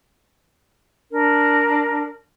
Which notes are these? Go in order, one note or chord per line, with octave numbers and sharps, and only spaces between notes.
D4 A#4